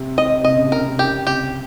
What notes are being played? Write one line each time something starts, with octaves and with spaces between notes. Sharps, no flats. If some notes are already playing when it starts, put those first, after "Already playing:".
Already playing: C3
D#5
C3 D#5
C#3
C3
C#3 A#4
C3
C#3 G4
C3 G4